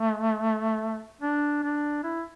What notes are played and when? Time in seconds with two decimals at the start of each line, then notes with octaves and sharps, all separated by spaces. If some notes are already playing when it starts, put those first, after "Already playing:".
Already playing: A3
1.21 D4
1.62 D4
2.04 E4